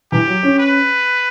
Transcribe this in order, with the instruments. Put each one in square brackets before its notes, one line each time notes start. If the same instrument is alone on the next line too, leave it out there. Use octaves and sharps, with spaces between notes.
[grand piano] E3 [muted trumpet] G4
[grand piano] F#3
C#4
[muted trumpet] B4